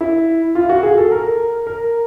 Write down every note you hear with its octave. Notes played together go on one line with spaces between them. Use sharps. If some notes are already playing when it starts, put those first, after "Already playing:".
E4
F4
F#4
G#4
A4
A#4
A#4